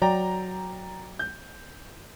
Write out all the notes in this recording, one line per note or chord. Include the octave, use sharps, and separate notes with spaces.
F#3 D5 G5 A#5
G6